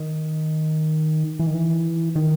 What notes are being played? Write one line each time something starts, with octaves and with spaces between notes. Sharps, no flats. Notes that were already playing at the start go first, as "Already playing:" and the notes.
Already playing: D#3
E3
D#3
E3
D#3